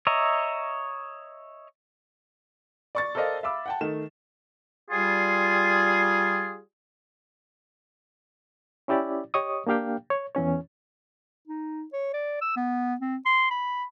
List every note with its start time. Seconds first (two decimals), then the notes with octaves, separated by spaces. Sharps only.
0.07 C#5 D#5 E5 A#5
2.95 D5 C#6 A6
3.15 A4 A#4 C5 D5 D#5 F5
3.43 E5 F5 B5 D6 E6
3.66 F#5 G5 A5
3.81 D#3 A3 E7
4.90 G3 F4 G#4
8.88 C#4 E4 G4 D5
9.34 G4 C#5 D#5 C#6 D#6
9.67 A#3 D4 G4 F5 G5
10.10 C#5
10.35 E2 E3 C#4 C#5
11.48 D#4
11.93 C#5
12.14 D5
12.41 E6
12.56 B3
13.00 C4
13.26 C6
13.50 B5